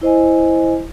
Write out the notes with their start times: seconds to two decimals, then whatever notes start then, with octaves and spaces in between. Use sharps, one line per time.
0.02 E4 C5 D#5 G#5